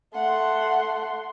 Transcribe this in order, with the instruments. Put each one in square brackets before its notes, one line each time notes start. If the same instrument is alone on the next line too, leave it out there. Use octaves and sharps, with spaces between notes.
[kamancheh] A3 C6 [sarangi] F#5